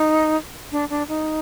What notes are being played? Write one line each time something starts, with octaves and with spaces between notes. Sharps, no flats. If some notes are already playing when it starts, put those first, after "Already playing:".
Already playing: D#4
D4
D4
D#4